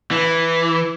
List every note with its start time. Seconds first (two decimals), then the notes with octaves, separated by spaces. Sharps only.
0.11 E3